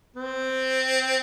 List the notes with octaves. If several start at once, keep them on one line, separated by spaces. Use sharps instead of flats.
C4